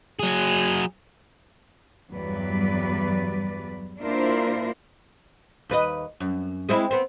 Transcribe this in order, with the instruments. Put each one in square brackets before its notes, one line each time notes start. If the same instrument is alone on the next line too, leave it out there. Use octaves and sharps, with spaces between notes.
[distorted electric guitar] F#3 G#4
[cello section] E2 G2 F#3 G3 B4 D5
A#3 D4 E4 F4 A#4 C5
[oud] D#2 B4 D#5
F#2
G#3 C4 E4
B3 C4